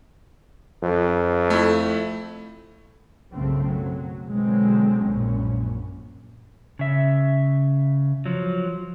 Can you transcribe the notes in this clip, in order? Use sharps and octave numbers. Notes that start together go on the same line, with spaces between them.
F2
A3 E4
B1 F#2 C#3 F3 A3 C4
F#3
B2 D3 F#3 G#3 C4
A#1 F#2 A#2 C#4
C#3 E5
F3 F#3